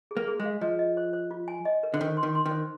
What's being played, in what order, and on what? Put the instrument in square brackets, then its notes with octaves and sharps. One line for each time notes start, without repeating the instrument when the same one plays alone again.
[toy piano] G#4
[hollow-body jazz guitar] A#3
[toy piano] G#4
[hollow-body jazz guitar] G#3
[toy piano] F5
[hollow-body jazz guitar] F3 [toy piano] D#5
[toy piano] D#5
C5
C5
F4
G#5
D#5
A#4
[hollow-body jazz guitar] D3
[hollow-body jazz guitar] D#3 [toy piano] C5
[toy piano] C6
[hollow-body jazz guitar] D#3
[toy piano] C6
[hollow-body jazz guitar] D#3
[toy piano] C5